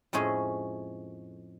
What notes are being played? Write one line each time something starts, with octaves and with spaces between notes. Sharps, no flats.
F2 A2 G#3 C#4 G#4